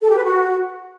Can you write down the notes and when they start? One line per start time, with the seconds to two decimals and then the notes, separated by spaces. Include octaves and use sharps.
0.02 A4
0.09 G4
0.16 B4
0.24 F#4